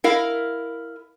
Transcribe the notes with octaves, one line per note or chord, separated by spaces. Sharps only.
E4 A#4 F5